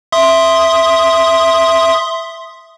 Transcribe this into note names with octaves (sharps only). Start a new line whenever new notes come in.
E5 C6 D#6